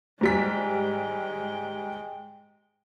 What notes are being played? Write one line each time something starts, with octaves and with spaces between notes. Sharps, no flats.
G#2 G3 G#3 G5 B6